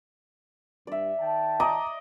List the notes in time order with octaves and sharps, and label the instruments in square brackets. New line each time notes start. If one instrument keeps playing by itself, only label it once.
[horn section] G2 [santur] D5 E5
[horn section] D#3 G5 A5
[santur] D5 D#5 D6 [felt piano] A#5